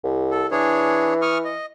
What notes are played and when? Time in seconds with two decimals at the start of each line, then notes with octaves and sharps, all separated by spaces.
0.04 C2
0.31 A4
0.51 E3 D4 G#4 C#5
1.22 C#6 D#6 F6
1.45 D#5